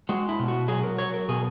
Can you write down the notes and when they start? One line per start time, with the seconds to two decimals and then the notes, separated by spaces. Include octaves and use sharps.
0.09 G#3 F#4
0.29 E4
0.39 B2
0.48 F#4
0.68 F#3 G#4
0.84 A#4
0.98 F#3 C#5
1.14 A#4
1.29 B2 G#4